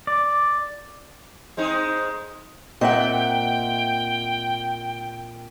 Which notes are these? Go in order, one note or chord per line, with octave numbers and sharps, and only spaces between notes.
D5
G#3 C4 D#4
A#2 C4 D#5 E5 F#5 G5